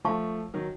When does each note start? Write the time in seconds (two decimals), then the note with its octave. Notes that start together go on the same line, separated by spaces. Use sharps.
0.04 F3 A3 C5 F5 A5 C#6
0.54 D#3 F#3